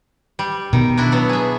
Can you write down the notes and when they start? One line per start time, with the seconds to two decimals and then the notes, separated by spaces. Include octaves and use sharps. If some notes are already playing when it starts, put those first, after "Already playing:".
0.39 G3
0.73 B2 D#3
0.97 D4 E4 F#4
1.12 F#3 B3
1.29 G#4 E5